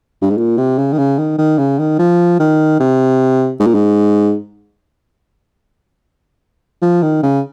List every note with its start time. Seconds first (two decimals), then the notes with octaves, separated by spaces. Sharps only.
0.22 G2
0.30 G#2
0.38 A#2
0.58 C3
0.78 C#3
0.93 D#3
0.98 C#3
1.18 D#3
1.38 D#3
1.58 C#3
1.79 D#3
1.99 F3
2.40 D#3
2.80 C3
3.60 G#2
3.67 A#2
3.74 G#2
6.82 F3
7.02 D#3
7.22 C#3